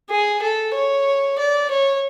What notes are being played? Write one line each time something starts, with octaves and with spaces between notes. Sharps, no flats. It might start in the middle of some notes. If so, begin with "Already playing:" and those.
G#4
A4
C#5
D5
C#5